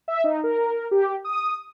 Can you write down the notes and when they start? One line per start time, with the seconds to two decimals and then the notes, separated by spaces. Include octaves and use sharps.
0.08 E5
0.24 D#4
0.44 A#4
0.91 G4
1.25 D#6